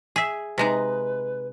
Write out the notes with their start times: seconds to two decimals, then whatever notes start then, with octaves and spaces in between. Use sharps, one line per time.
0.16 G#4 E5
0.58 C3 G#3 D#4 B4